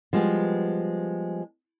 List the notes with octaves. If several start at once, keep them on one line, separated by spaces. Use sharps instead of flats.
F3 G3 G#3 B3